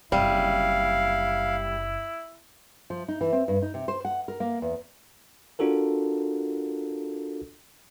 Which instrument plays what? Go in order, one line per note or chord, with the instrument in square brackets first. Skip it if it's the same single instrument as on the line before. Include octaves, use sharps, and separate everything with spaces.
[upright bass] F#1 C3 [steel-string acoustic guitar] G3 [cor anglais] E4 [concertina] F5
[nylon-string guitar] F3
D#4
E3
C4
G2
D#4
C3
C5
F#5
A#4
A#3
E2
[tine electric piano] D4 F4 F#4 A4 A#4